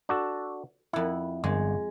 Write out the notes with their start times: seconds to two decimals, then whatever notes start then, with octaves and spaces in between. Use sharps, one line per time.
0.09 D4 F#4 A4
0.93 F2 E4 F#5
1.44 G1 G#3